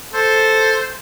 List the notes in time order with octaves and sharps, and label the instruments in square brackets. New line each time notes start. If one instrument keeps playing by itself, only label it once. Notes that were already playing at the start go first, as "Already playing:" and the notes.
[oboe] A4 [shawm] C5